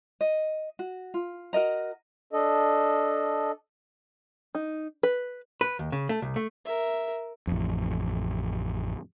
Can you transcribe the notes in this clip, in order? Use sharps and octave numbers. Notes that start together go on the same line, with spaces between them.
D#5
F#4
F4
F#4 A#4 D#5 A#5
D4 A4 D#5
D#4
B4
B4
D#2
C#3
A3
C2
A3
A#4 E5
A1 F2